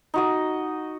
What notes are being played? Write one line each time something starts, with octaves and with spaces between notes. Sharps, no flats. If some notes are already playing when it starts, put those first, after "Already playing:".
D#4 F#4 D#5